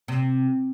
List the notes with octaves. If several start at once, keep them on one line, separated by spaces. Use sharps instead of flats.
C3